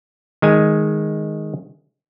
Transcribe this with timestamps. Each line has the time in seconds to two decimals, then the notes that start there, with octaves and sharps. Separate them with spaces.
0.42 D#3 G#3 G#5